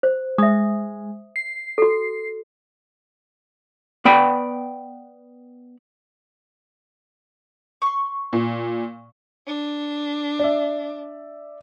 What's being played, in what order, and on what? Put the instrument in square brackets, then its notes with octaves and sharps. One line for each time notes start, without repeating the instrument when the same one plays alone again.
[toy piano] C5
[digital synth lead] G#3 [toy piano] E5 D#6
[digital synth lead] C7
[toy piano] F#4 A4
[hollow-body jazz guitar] B3 D5 G5 B5
[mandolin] C6 C#6
[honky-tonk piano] A#2
[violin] D4
[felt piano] D5 E5